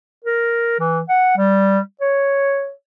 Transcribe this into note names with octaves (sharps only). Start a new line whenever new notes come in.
A#4
E3
F#5
G3
C#5